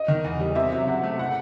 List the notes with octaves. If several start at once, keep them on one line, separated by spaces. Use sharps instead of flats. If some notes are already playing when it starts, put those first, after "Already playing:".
Already playing: D#5
D#3
E2
G3
C3 E5
F#3 E5
C3 F#5
A3
F#5